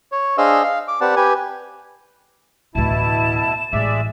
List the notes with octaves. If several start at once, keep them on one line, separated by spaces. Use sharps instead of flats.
C#5
D4 G#4 C5 D#5 F5 E6
F5
D6
C4 G4 B4 D5 F#5 A5
G4 B4 G#5
A1 D2 B2 E4 A5 E7
A1 G#3 D5 E5